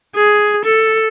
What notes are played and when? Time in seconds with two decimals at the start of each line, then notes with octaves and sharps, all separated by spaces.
0.16 G#4
0.65 A4